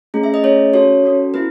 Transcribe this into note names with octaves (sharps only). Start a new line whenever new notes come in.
A3 C#4 G#4
E5
D#5
A3 C#4 G#4 C#5
C#4 F#4 A4 C#5
C#4 F#4 A4
B3 E4 B4